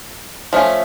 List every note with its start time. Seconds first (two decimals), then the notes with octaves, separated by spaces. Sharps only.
0.53 F3 A3 C#4